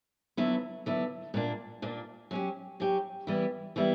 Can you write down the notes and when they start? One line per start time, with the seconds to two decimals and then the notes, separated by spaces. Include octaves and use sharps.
0.37 D3 F#3 B3 E4
0.86 D3 F#3 B3 E4
1.34 A#2 A#3 D4
1.82 A#2 A#3 D4
2.31 F#3 C#4 G4
2.80 F#3 C#4 G4
3.27 E3 G3 B3 E4
3.76 E3 G3 B3 E4